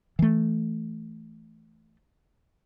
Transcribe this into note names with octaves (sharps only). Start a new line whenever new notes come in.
E3 A3